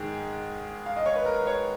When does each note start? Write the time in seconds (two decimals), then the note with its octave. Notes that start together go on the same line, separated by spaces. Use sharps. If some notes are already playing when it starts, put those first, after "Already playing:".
Already playing: G#2 D#3 G#3 G#4
0.86 F5
0.96 D#5
1.06 C#5
1.15 B4
1.25 A#4
1.47 C#5